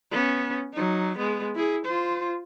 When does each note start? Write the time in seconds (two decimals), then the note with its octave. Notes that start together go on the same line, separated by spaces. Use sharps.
0.11 B3 C#4
0.73 F#3 D#4
1.17 G#3 B3
1.56 E4 G#4
1.85 F4 C5